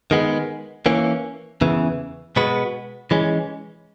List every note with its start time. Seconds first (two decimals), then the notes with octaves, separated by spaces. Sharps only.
0.11 D#3 G#3 B3
0.86 E3 A#3 C#4
1.61 E2 C#3 E3
2.36 B2 G#3 B3 F#4 B4
3.11 E3 G#3 C#4